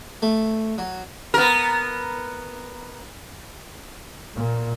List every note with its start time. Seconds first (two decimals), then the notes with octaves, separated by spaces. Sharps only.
0.22 A3
0.78 F#3
1.34 B3 A#4
4.36 A#2